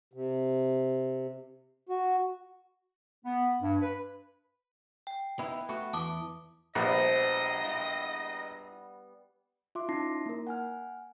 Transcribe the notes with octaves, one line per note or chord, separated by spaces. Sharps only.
C3
F#4
B3
G2
B4
G5
B3 D#4 E4
A3 B3 F#4
E2 E3 A5 D6 D#6
A#1 F3 G3 B3 C5 D#5
E4 F4
F4 E5 C6 D6
C#4 D#4 E4 A5 A#6 C7
A#3 A#4
F#5 G#5 F6